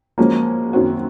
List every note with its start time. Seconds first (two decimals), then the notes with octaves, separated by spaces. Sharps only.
0.18 F3 G#3 A#3 C#4 F#4 C5
0.73 F#2 D#3 F#3 C4 F#4